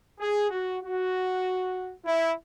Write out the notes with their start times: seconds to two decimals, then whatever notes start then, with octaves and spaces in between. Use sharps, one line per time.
0.20 G#4
0.50 F#4
0.82 F#4
2.05 E4